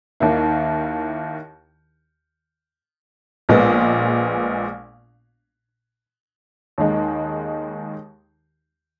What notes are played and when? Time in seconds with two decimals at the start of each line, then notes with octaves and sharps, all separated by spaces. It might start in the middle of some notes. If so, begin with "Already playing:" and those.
0.20 D#2 D#3 A#3 E4
3.49 A#1 A#2 G#3 B3
6.78 D#2 D#3 G#3 D#4